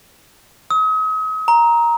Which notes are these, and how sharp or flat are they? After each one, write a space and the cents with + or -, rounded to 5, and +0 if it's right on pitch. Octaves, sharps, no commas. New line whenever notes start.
D#6 +40
A#5 +5